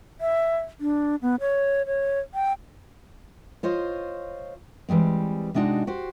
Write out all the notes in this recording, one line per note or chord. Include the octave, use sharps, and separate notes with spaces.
E5
D4
B3
C#5
C#5
G5
F4 C5 C#5 D#5
E3 G3 G#3 C4
C3 G#3 D4 D#4 F#4
F#4 G4 C5